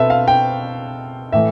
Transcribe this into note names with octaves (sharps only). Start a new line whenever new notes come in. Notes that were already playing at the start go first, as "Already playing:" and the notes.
Already playing: B2 C4 A4 B4 E5
F5
G5
A2 E3 A3 E5